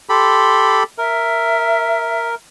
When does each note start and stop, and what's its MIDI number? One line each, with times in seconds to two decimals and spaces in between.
0.09 0.83 67
0.09 0.83 69
0.09 0.83 83
0.09 0.76 84
0.98 2.35 70
0.98 2.29 76